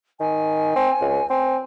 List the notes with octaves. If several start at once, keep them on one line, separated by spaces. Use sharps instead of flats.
D#3 G#5
C4
C#2
C4 G#5